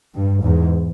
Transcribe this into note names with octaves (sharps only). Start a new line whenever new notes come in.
G2
E2 G#2